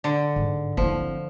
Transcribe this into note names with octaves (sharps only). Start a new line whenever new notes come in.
D3
G#2
F3 C4 E4